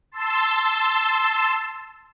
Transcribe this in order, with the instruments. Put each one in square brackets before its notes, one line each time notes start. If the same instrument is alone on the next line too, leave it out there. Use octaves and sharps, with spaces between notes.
[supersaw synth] A5 C6 E6